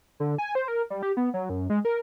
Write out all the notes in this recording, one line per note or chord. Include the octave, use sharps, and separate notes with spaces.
D3
G#5
C5
A#4
G3
G4
B3
F#3
F#2
G#3
A#4